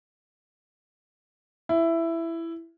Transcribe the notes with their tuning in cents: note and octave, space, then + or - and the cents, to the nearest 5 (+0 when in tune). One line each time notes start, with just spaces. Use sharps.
E4 +10